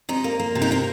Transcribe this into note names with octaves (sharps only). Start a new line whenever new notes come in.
C3 D#4
A#3
A#3
C3
D#4
A#3 C4